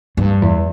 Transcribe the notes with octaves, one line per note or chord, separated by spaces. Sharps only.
G2
E2